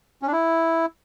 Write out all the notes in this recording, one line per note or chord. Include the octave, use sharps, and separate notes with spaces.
C#4
D4
E4